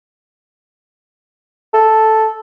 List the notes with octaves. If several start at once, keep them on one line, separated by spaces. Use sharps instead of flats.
A4